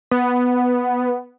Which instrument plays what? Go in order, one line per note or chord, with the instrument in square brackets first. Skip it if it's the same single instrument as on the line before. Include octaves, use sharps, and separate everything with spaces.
[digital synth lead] B3